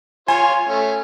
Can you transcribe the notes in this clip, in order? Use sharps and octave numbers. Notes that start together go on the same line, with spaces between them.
F4 C#5 G#5
A3 C#4